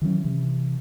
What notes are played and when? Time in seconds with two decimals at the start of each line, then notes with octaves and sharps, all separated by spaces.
0.02 D#3 E3 F#3 C#4
0.24 C3 E3